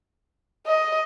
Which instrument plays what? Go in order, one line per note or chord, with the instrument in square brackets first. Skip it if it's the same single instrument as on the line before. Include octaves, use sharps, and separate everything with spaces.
[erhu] D#5